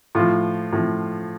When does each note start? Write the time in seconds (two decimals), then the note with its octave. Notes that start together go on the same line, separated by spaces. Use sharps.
0.15 A2 F3 F4
0.73 A2 F3